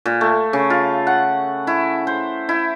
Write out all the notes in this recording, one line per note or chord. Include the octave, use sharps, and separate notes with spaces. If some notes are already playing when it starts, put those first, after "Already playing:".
A#2
A3
C#3
F4
F#5
E4
C5
E4